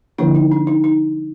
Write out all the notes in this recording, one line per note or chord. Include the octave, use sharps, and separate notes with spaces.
D3 F3 A#3 D4 E4
D#4
D4
D#4
D#4